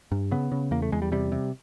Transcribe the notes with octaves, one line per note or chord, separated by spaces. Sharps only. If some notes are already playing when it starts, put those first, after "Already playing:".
G2
C#3 B3
C#3
E2 A#3
A3
E2 G#3
G3
C3 G3
C3